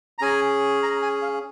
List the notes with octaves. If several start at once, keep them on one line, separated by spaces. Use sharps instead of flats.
A#5
C#4 G#4 G#5
A#5
G#5
F5